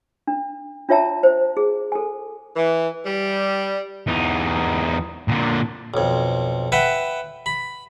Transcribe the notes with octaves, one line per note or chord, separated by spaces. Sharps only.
D4
D4 F4 C#5 E5 A5 A#5
C5
G#4
A4 G#5
E3
G3
E2 D#4
A#2 D3
B1 F2
B4 E5 F#5 G5
B5